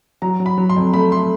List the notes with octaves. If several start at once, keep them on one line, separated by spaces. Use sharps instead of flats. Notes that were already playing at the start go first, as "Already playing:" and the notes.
F#3 A#5
F#3
B5
F#3
C6
F2
A3 B5
A3 C6